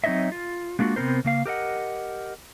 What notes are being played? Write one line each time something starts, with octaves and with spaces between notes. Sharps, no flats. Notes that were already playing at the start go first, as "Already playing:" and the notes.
F#3 C4 D#4 C#5 D#5 E5
F4
G#3 A#3 D4 F4 F#4
C3 B3 C4 D#4 A#4 C5
C#3 A#3 F5
G4 A#4 D#5 F#5